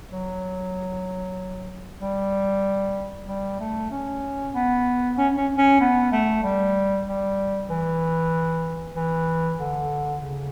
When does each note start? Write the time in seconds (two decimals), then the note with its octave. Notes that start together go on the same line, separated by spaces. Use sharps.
0.13 F#3
2.01 G3
3.28 G3
3.59 A3
3.91 C#4
4.54 B3
5.18 C#4
5.37 C#4
5.57 C#4
5.81 B3
6.12 A3
6.43 G3
7.07 G3
7.70 E3
8.96 E3
9.59 D3
10.22 C#3